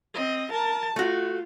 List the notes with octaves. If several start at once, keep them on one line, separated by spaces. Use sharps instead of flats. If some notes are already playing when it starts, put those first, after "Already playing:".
C4 D#5
A#4 A5
A3 F4 F#4